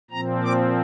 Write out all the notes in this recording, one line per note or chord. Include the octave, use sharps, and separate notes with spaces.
A#2 F3 C4 A#5
D6